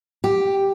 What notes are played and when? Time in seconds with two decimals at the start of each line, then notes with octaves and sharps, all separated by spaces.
0.24 G4